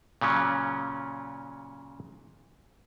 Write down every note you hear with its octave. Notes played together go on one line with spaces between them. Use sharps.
A#2 C#3 F#3 C#4